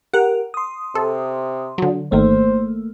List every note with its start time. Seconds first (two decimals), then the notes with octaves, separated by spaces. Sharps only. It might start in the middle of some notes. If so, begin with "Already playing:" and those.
0.14 G4 A#4 F#5
0.54 C6 D#6
0.95 C3 A4
1.78 D3 F#3
2.12 G#1 D#3 A3 A#3 C5